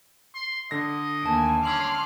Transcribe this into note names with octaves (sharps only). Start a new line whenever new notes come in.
C6
D3 D#5 A#6
D#2 A3 G#5 A5 D7
C#4 C6 D6 E6 F6 F#7